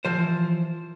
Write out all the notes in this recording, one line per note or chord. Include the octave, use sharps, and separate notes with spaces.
E3 F3 C5